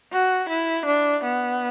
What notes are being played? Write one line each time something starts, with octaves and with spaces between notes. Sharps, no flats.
F#4
E4
D4
B3